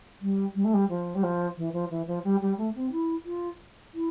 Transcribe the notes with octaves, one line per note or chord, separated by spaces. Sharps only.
G3
G3
A3
G3
F3
G3
F3
E3
F3
E3
F3
G3
G3
A3
C4
E4
F4
E4